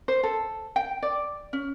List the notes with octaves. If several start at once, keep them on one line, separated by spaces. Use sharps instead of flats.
C5
A4
G5
D5
C#4